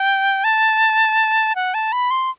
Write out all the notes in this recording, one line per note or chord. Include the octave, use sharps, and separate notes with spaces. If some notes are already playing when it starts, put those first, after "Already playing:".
Already playing: G5
A5
F#5
A5
B5
C6